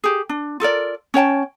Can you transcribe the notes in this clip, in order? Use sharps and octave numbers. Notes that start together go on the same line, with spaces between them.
G4 G#4
D4
F4 A4 A#4 D5
C#4 C#5 G5 A5